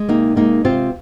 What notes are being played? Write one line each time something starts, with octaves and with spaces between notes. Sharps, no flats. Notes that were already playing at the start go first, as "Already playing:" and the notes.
Already playing: G#3
C3 A#3 D#4
G#3 A#3 D#4
C3 C4 F4